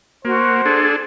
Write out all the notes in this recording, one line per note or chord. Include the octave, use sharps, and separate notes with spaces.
A#3 F#4 C5
D4 G#4 A4